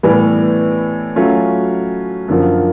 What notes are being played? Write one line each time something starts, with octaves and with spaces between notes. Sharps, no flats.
A2 E3 G3 B3
F#3 A3 C#4 F4
F#2 D3 F3 A#3